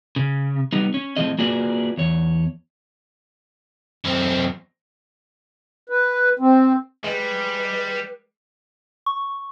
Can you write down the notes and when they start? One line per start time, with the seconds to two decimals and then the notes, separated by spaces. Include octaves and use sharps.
0.16 C#3
0.73 G3 B3 D#4
0.94 C#4
1.17 A2 F3 G#3 C4 D#5
1.39 A#3 F4 F#4 G#4 B4 D5
1.97 E2 C#5
4.05 F#2 C4
5.89 B4
6.39 C4
7.04 G3 G#3 B4
9.06 C#6